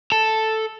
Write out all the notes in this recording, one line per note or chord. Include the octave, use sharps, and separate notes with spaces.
A4